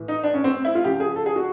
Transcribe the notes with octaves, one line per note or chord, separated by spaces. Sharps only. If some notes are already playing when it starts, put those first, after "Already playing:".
Already playing: A2 E3
D#4
D4
C#4
C4
E4
F4
C#3 F3 G4
G#4
A4
G#4
F#4